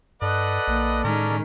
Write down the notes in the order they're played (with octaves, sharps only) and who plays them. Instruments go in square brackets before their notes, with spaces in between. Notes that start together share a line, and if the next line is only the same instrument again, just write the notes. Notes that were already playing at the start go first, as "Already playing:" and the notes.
[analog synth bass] G2 [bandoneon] A4 D5 [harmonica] B4 D#5 F#5
[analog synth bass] A#1 [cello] A#3
[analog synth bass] A2 [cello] D#3 G#3 [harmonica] C#4 A#4